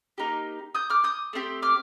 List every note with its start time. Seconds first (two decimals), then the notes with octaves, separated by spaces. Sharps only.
0.18 A#3 D#4 G4
0.75 D#6 G6
0.90 D6 F6
1.04 D#6 G6
1.33 A3 C4 G4
1.62 D6 F6